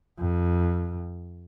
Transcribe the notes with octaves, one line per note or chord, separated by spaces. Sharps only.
F2